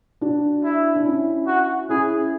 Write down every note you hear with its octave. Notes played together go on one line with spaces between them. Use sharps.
D4 F#4
E4
D4
C#4 E4
F#4
C#4 E4 G#4